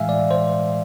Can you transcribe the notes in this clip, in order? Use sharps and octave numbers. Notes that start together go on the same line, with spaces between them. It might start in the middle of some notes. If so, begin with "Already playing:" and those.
Already playing: A2 E3 G#3 E5 F5 G#5
D5
C5